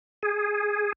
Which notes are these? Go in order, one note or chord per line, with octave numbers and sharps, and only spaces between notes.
G#4